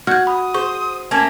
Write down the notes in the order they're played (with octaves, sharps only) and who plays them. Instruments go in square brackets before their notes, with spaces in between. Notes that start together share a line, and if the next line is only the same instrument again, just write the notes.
[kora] F#4 [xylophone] F6 G6 [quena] G#6
[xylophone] B5 [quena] D#6
[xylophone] G#4 C#6 [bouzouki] C5
[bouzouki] A3 A#3 C#4 [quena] A5